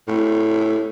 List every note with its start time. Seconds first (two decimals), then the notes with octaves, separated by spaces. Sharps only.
0.08 A2